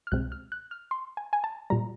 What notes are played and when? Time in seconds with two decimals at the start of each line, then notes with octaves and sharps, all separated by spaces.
0.07 F6
0.12 C2 B2 G#3 C4 F#6
0.32 F6
0.52 F#6
0.71 F6
0.91 C6
1.17 G#5
1.33 G#5
1.44 A5
1.70 A#2 G3 A#5